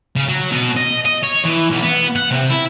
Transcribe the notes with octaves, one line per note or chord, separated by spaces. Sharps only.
C#3
F#3
B2
D#5
D#5
C#5
E3
B1
B3
F#5
C3
E4